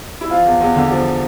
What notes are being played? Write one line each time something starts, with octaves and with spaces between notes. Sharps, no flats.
E4
F3 F4
E2
E2
D3
F3